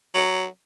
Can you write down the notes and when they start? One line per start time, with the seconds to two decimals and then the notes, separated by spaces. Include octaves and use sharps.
0.15 F#3